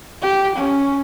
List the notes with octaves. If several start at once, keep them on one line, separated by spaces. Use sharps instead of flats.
G4
C#4